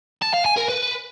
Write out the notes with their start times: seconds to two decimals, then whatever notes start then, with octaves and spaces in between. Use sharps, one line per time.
0.22 A5
0.34 F5
0.46 G#5
0.58 A#4
0.69 B4